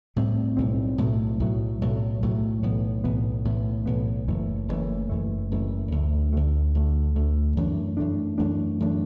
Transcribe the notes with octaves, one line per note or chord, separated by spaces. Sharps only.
B1 A2 G3 C4
B1 A2 G3 C4
B1 A2 F#3 A3
B1 A2 F#3 A3
B1 A2 F#3 A3
B1 A2 F#3 A3
B1 A2 E3 B3
B1 A2 E3 B3
B1 A2 E3 B3
B1 A2 E3 B3
F#1 F#2 E3 A3
F#1 F#2 E3 A3
F#1 F#2 E3 A3
F#1 F#2 E3 A3
D2 D3 A3
D2 D3 A3
D2 D3 A3
D2 D3 A3
F#2 E3 A3 D4
F#2 E3 A3 D4
F#2 E3 A3 D4
F#2 E3 A3 D4